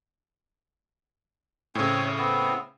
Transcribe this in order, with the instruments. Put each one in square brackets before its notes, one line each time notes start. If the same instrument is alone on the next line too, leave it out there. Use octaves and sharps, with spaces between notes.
[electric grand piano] A2 C#3 [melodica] C4 C#4 G#5
[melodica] B3 C4